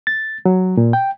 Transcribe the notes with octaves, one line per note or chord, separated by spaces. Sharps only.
A6
F#3
A#2
G5